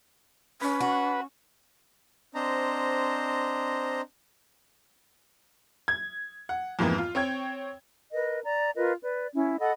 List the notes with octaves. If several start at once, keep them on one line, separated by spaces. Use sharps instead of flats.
C#4 B4
F#4
C4 D4 C5 D#5 A#5
G#6
F#5
F2 G#2 E3 A#3 B3
F4
C4 C#5 G5 G#6
A#4 B4 D#5
D5 A#5
F4 A#4 B4 D#5
B4 D5
C#4 E4
A4 D#5 F#5 B5